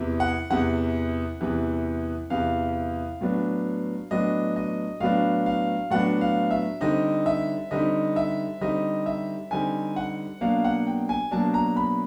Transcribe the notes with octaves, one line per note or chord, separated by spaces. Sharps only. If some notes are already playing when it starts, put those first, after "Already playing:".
Already playing: E2 C3 E3
F#5
E2 C3 E3 F#5
E2 C3 E3
E2 C3 E3 F5
A2 F#3 B3 D4
A2 F#3 B3 D4 D#5
D#5
A2 F#3 B3 D4 F5
F5
A2 F#3 B3 D4 F#5
F5
E5
D3 G3 C4 D#4 D#5
E5
D3 G3 C4 D#4 D#5
E5
D3 G3 C4 D#4 D#5
E5
D3 G3 C4 D#4 G#5
F#5
B2 F#3 A#3 D4 F5
F#5
G5
G#5
B2 F#3 A#3 D4 A5
A#5
B5